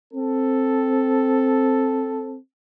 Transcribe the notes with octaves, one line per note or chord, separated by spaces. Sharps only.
C4 A4